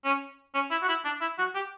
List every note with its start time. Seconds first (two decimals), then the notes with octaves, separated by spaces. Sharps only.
0.04 C#4
0.54 C#4
0.71 E4
0.82 F#4
0.88 E4
1.04 D4
1.21 E4
1.38 F#4
1.55 G4